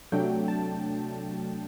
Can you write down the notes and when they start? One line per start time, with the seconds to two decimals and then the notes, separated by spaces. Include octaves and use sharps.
0.12 C3 F#3 A3 D4 G5
0.48 A5